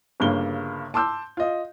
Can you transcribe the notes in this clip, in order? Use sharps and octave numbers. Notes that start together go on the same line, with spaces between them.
G1 G2 C#3 A#3 G7
A5 C6 D6 E6 G6
F4 D#5